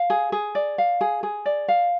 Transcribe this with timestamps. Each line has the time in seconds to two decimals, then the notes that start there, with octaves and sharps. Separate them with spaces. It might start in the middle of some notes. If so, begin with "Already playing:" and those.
Already playing: F5
0.10 G#4
0.32 G#4
0.55 D5
0.78 F5
1.01 G#4
1.23 G#4
1.46 D5
1.68 F5